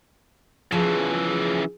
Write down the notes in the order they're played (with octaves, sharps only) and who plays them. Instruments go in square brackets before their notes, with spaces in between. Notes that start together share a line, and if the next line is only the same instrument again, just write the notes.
[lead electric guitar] C#3 E3 [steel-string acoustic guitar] F3 [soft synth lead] G#4